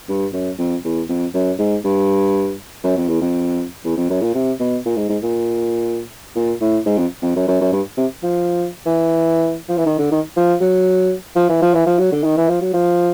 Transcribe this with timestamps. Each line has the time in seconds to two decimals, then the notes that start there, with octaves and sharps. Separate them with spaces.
0.09 G2
0.33 F#2
0.58 F2
0.84 E2
1.09 F2
1.34 F#2
1.59 G#2
1.84 G2
2.84 F#2
2.97 F2
3.09 E2
3.21 F2
3.84 E2
3.97 F2
4.10 F#2
4.21 A#2
4.34 C3
4.60 B2
4.85 A#2
4.97 G#2
5.09 G#2
5.23 A#2
6.36 A#2
6.61 A2
6.86 G#2
6.97 F2
7.22 F2
7.36 F#2
7.48 F#2
7.61 F#2
7.72 G2
7.97 C3
8.23 F3
8.86 E3
9.69 F3
9.77 E3
9.86 D#3
9.98 D3
10.12 D#3
10.37 F3
10.60 F#3
11.36 F3
11.49 E3
11.62 F3
11.74 E3
11.86 F3
11.98 F#3
12.12 D3
12.24 D#3
12.37 E3
12.49 F3
12.61 F#3
12.74 F3